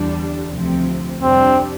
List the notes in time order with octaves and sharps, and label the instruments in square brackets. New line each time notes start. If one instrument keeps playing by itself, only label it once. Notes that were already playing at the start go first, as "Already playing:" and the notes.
Already playing: [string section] E2 D3 G3 D4
D2 C3 F3 C4
[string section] F2 C3 G3 D4 [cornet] C4